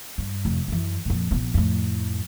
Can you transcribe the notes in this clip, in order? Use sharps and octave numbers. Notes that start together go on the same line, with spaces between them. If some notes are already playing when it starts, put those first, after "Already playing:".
G2
F1
F#2 E3
F2 A#2
A#1 B3
F2 A2